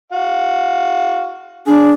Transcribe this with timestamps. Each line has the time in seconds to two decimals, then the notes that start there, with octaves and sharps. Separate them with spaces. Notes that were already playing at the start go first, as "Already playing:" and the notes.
0.12 F#4 F5
1.67 D4 G#4